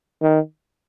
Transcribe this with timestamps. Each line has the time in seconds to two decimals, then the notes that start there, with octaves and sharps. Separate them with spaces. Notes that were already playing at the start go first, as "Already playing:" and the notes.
0.22 D#3